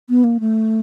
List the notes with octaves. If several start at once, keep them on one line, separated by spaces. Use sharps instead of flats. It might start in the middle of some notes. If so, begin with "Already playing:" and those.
B3
A#3
A3